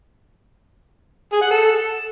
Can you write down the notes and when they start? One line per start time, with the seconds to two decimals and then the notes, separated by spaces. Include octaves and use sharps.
1.32 G#4
1.42 F#5
1.51 A4